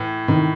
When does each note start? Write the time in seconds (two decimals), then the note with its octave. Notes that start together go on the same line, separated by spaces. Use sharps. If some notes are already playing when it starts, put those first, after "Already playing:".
Already playing: A2 E3
0.28 A2 D#3